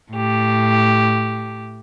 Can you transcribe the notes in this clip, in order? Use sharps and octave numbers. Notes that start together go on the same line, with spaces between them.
A2 G4